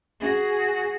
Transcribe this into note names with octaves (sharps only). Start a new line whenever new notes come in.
F#4 G#4